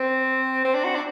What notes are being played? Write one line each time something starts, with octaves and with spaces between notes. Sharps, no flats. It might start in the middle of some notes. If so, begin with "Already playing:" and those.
Already playing: C4
C4
D4
F#4
D4